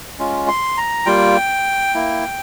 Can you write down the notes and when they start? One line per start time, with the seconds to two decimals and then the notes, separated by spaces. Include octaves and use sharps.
0.19 G#3 C#4 F4
0.48 C6
0.77 A#5
1.06 G3 A#3 F4 G5
1.95 A#3 E4